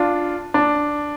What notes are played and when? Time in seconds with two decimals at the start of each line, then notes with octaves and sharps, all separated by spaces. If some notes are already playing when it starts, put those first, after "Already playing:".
Already playing: D4 F4
0.54 D4